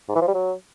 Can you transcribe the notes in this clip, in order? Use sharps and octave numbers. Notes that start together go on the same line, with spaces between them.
G#2
E3
F3
G3
F#3